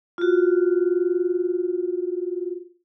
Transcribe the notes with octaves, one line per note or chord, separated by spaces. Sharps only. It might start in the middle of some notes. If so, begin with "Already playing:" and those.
F4 F#4